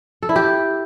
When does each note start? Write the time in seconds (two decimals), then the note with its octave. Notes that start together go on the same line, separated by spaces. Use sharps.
0.23 A4
0.29 E4
0.36 G4